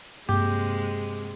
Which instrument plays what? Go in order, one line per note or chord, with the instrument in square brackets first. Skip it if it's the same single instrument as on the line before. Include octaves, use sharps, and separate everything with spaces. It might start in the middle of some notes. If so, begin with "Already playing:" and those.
[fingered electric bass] G2 A#3 [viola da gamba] C3 G#3 [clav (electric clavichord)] G4